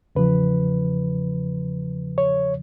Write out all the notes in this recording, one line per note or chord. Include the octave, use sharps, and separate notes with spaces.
E2 C#3 F3 B4
C#5